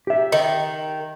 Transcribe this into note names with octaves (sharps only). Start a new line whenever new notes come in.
G4 E5
D#3 D#5